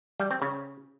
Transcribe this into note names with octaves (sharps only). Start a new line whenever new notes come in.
G3
C4
C#3